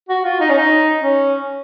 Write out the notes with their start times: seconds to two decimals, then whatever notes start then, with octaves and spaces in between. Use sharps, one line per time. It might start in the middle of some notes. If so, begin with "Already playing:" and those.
0.09 F#4
0.25 F4
0.40 D#4
0.49 C#4
0.58 D#4
1.03 C#4